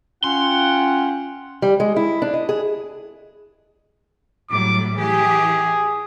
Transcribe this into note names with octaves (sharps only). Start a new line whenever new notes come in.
C#4 F4 F#5 G5 C6
G3
G#3
E4
D4
D#5
G#4
A2 F#3 G3 D6
E3 G4 G#4